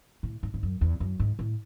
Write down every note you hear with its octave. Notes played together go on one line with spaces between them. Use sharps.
A2
G#2
G#2
F#2
E2
F#2
G#2
A2